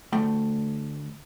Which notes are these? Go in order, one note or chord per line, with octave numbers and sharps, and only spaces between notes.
D2 A3 G5